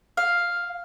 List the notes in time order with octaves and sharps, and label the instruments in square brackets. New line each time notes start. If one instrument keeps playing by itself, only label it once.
[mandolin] F5